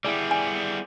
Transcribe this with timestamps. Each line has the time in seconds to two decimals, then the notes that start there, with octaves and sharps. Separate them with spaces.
0.05 G3 B3 E4 G#4 D5
0.31 G#5